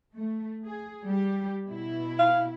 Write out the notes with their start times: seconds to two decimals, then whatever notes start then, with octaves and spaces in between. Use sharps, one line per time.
0.16 A3
0.66 G#4
1.05 G3 G4
1.68 B2 E4
2.19 F5